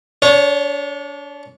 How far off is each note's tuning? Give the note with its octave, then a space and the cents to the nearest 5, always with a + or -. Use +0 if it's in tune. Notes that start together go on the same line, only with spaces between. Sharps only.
D4 -30 C#5 +0